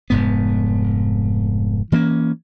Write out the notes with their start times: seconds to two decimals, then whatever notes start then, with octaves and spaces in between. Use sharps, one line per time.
0.10 F1 G#2 B3
1.92 E3 A#3 C4 C#4